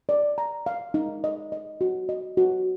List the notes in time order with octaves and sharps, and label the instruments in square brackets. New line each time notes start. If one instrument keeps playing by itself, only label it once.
[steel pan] D5
A#5
F5
D#4
D#5
D#5
F#4
D#5
F#4